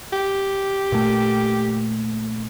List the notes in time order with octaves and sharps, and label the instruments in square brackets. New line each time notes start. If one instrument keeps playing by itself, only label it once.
[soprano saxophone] G4
[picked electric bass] A#2 A3